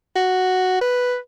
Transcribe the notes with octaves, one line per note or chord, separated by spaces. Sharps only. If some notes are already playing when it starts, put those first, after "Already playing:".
F#4
B4